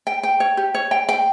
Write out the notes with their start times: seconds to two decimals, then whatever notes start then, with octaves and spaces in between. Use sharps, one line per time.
0.07 G5
0.23 G5
0.40 C#5
0.57 G4
0.74 C#5
0.91 G5
1.09 G5